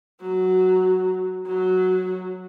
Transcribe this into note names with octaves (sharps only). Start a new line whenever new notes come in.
F#3
F#3